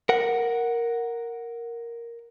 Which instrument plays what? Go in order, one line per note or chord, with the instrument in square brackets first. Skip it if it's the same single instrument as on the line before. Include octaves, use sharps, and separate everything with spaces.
[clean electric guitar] A#4 F#5